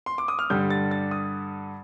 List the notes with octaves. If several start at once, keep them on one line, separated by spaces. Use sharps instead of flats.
C6
D6
D#6
F6
G2 D3 G3 G6
A6
A6
D#6